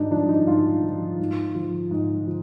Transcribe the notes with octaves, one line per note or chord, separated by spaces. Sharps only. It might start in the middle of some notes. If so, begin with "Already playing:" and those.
Already playing: G#2 D4 D#4
F3 D4
D#4
G#2 F4
F3
G#2
F3
G#2
F3